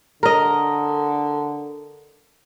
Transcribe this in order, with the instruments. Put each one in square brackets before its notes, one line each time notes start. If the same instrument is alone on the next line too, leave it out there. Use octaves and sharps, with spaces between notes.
[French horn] D3 [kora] A#4 D#5